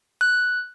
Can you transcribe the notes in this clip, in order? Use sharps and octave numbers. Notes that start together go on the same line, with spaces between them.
F#6